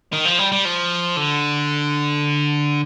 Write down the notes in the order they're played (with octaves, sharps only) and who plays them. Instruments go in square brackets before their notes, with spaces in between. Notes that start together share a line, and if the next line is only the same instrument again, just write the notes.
[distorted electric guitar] D#3
F3
G3
G3
F3
D3